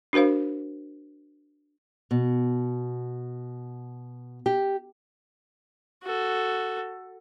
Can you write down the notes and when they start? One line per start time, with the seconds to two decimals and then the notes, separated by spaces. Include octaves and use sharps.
0.13 D4 F#4 A#4 C5 F5
2.11 B2
4.46 G4
6.03 F#4 A4